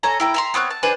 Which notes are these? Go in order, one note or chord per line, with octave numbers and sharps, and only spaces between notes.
A4 C#5 G#5 A#5
E4 G5 A#5
E5 A#5 C6
B3 C4 C#5 F#6
A5
D4 G#4 B4 C5